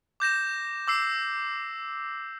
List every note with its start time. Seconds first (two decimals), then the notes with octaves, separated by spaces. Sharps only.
0.20 D6 G6 A#6 E7
0.88 D6 E6 C7